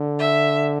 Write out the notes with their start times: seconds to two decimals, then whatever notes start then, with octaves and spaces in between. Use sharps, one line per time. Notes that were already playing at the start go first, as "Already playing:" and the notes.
Already playing: D3
0.20 E5